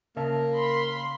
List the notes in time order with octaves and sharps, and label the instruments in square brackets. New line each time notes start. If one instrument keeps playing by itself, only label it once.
[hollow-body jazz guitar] C#3 E5 A5 [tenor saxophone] A#3
[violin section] B5 C6